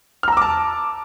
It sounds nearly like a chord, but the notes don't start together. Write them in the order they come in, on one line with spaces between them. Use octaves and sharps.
F6 A#5 E6 D6 A5